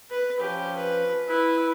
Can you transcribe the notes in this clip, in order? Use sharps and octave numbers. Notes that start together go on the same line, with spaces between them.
B4
F3 C#4 G4
B4
E4 B4